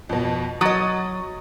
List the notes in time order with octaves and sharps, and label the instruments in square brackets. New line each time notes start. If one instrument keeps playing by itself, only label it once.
[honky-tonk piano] F2 B2
[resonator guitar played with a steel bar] F#3 D#5 [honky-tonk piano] D#6 A6